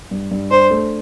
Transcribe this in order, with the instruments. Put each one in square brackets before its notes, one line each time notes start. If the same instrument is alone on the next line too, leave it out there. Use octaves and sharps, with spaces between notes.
[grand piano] G2
G2
[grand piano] D4 [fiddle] C5
[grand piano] A3